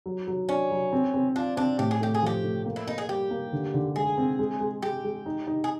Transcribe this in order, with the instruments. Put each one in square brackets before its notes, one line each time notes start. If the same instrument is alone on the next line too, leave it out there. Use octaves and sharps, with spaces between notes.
[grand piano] F#3
F#3
[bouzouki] C#4 [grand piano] D4
[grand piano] F#3
C4
C4
[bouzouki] D4 [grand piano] F4
[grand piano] C4 [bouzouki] D4
[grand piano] A2 [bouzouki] G4
[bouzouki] G#4
[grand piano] A3 [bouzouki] G4
[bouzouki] G#4
[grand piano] F3 [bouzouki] G4
[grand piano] A3
A#3
[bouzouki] E4
[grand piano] A#3 [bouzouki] D#4
[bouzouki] G#4
[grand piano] G3 [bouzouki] G4
[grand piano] A#3
D3
D3
[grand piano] G#3 [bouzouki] G#4
[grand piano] C4
G#3
G#3
[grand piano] G#3 [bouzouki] G4
[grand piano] G#3
D#4
D#4
[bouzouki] G#4